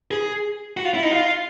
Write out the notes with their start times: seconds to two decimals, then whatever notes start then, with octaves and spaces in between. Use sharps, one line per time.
0.11 G#4
0.77 F#4
0.85 F4
0.94 E4
1.03 D#4
1.11 F4